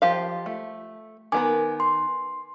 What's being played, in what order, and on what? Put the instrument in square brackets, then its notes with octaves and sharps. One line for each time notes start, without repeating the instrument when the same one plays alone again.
[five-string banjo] F3 G4 F5
A3
[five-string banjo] D#3 B3 A#4 [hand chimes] G#5 D6
[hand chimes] C6